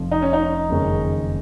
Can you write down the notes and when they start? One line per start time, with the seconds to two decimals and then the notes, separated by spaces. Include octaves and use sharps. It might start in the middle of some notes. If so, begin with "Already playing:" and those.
Already playing: F1 F2 F3
0.11 D#4
0.22 C#4
0.33 D#4
0.69 F#1 F2 D#3 G#3 C#4